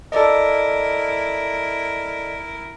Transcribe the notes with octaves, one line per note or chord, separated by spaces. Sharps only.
E4 A4 A#4 D5 D#5